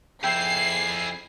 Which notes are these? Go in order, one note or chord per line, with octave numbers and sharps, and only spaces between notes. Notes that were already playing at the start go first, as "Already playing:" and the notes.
F2 E4 G#4 E5 G5 C7